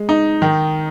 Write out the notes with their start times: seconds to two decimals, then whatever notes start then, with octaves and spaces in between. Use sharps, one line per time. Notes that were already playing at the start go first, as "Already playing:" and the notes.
Already playing: G#3
0.09 D#4
0.42 D#3